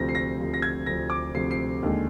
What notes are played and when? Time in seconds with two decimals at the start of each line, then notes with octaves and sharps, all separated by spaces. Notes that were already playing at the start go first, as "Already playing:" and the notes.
Already playing: D2 C3 F3 A#6
0.09 C7
0.15 A#6
0.39 D2 C3 F3
0.54 A#6
0.62 G#6
0.86 D2 C3 F3 A#6
1.10 D6
1.34 D2 C3 F3 C7
1.51 C7
1.83 D#2 D3 G#3